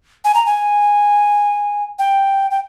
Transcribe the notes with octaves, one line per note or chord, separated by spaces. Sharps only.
G#5
A#5
G#5
G5
G5